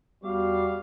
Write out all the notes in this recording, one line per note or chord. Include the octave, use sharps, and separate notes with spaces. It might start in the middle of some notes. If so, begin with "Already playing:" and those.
E2 G3 B3 F#4 F5 D6